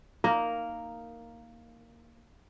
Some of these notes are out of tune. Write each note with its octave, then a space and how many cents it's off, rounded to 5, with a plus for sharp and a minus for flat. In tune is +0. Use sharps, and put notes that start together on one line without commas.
A#3 -5 D#4 +0 A#4 +0